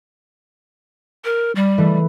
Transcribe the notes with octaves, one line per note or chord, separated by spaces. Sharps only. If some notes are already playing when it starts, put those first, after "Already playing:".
A#4
G3
E3 A3